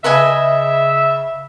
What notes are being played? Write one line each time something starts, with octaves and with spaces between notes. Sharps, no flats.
C#3 B4 D#5 E5 G#5